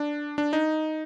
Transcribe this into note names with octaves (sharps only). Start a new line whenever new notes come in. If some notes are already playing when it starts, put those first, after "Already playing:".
Already playing: D4
D4
D#4